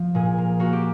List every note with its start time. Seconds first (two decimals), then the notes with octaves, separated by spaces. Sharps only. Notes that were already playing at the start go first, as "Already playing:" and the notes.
Already playing: F3
0.15 A#2 G#4
0.38 A#3
0.60 A#3 F#4
0.73 G4